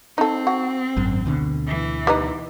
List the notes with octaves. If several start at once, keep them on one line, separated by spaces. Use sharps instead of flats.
C4 D#4 A4
F#4
G#1 F#2
D2 B2 D3
E3
G3 B3 D#4